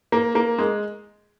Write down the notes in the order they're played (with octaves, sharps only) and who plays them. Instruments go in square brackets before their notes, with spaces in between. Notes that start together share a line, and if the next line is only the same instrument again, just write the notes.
[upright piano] A#3
A#3
G#3